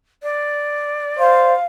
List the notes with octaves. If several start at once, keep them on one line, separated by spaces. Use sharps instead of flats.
D5
C5 F5